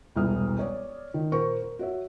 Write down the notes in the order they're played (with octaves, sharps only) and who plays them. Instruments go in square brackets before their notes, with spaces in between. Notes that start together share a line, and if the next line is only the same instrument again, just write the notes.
[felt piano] E1 C2 E4 A4 D#6 F6
C#5 D5
D#3
A#2 A#4 C5 C#6
A#4
F#4 C#5 E5